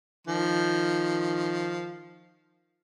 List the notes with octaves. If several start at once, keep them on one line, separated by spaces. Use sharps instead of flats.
D#3 F3